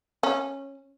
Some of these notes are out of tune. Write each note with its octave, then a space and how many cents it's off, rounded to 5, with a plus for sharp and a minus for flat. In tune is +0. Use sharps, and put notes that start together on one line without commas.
C#4 -15